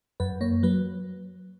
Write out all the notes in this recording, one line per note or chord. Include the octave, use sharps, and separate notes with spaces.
F#2 B4
A#3 C#5
F#3 B4